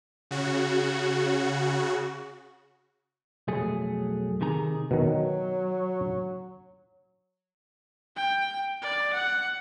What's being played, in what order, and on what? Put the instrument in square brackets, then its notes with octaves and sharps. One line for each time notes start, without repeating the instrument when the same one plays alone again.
[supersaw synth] C#3 F#4
[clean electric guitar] B1 F2 F#3 A3 G#4 A4
C3 D#3 G#4 A#5
[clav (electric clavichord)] B2 D#3 [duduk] F#3
[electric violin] G5
D5
F#5